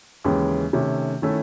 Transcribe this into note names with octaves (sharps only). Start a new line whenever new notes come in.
D#2 C#3 E3 G#3 C#4
C3 D#3 A3 C#4
D#3 A3 C#4 E4 A4